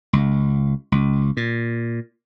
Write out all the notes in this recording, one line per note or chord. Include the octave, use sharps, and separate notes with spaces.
C#2
C#2
A#2